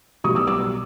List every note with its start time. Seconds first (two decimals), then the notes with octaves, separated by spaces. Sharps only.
0.24 B1 B2 G3 C#6 D#6
0.35 D6 E6
0.47 D6 E6